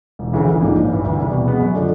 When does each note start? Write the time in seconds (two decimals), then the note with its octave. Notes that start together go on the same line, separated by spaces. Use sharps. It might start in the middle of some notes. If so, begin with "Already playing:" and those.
0.19 E1
0.33 D2 C#3 E3 A3
0.47 A#1
0.61 G#2 F3 A#3 D4
0.76 A1
0.89 G2 E3
1.04 D2
1.18 C3 E3 G3
1.32 B2
1.45 G#3 B3
1.60 F#2
1.74 D3 F3 A3 D4